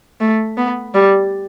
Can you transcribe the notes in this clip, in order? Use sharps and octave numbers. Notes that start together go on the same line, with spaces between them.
A3
B3
G3